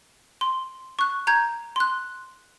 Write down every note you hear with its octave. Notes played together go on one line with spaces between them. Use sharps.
C6
C#6 F#6
A#5 G6 G#6
C6 F#6